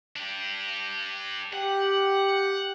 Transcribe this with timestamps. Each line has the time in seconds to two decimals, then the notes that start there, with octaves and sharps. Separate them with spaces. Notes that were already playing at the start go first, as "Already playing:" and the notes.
0.16 D4 G4
1.54 G4 F#5